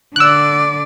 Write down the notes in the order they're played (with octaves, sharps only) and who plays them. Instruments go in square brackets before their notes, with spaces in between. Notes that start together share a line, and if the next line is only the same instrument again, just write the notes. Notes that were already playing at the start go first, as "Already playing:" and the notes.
[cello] D3 D5 [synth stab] E6 F#6